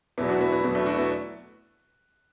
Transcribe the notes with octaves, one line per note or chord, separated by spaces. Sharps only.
E2 B2 F#3 B3 E4
D4 F#4
B3 E4
B3 E4
E2 B2 F#3 B3 E4
A3 D4
D4 F#4
B3 E4